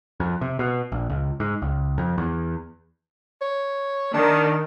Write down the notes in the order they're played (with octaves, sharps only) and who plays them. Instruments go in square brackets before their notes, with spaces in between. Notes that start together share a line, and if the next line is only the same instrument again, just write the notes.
[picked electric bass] F2
C3
B2
A#1
C#2
G#2
C#2
F2
E2
[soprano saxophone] C#5
[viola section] D#3 [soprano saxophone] D4